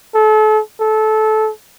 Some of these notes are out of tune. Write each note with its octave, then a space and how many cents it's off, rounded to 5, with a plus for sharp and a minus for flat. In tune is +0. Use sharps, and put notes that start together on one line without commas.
A4 -35
A4 -20